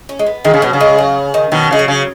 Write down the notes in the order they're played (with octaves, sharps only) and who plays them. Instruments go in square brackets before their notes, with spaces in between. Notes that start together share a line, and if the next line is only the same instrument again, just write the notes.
[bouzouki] C#4
G#3
B3
[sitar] D#3 [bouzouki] G#3
[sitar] C#3
[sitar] B2 [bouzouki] F#3
[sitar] C#3
[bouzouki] G#3
F#3
D#3
[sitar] B2 D#3 [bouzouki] F#3
[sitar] C#3 [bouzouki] G#3
[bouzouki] F#3
[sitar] C#3